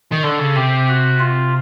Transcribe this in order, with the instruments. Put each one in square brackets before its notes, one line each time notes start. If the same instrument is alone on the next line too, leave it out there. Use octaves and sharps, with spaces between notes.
[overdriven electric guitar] D#3
[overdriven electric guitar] D3 [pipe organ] A4
[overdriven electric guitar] C#3
[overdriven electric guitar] C3 [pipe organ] G4
[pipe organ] F#4
F4